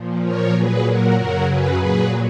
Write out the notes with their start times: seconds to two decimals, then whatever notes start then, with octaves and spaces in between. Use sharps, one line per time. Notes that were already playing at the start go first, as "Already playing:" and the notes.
Already playing: A#2 F3
0.23 A#4 C#5
0.54 A#2 F#3 G#4 B4
0.85 F#4 A#4
1.16 F#2 C#3 F#3 F#4 A#4
1.47 G#4 B4
1.78 A#2 F#3 G#4 B4